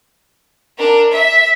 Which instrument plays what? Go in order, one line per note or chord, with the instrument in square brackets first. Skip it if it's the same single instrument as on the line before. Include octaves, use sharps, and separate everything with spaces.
[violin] D4 A#4
E5